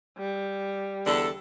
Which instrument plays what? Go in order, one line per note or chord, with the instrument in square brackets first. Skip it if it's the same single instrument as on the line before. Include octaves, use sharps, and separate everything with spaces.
[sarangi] G3
[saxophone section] E2 D3 A4